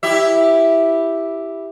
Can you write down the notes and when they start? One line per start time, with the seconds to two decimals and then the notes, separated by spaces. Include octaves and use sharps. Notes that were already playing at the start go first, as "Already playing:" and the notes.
0.03 E4 G4 E5